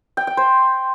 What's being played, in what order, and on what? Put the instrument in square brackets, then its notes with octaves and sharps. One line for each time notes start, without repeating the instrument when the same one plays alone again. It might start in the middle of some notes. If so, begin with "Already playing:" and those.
[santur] G5
G5
C5